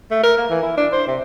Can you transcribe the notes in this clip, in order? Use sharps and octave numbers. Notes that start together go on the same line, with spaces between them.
A3
A#4
A#3
E3
E4
D4
C5
C3